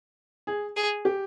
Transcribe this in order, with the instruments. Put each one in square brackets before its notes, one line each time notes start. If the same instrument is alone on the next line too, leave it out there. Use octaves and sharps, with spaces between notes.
[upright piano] G#4
[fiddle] G#4
[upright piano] G4